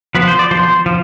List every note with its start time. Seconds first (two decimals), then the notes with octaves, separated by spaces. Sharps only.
0.15 F3 B3 B4
0.27 C5
0.39 D5
0.51 F3 B3 C5
0.86 F3